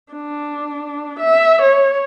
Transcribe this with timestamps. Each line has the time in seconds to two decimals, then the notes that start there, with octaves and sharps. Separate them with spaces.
0.13 D4
1.19 E5
1.62 C#5